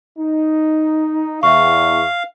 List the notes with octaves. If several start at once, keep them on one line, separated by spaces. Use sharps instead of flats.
D#4
E2 E5 F5 C#6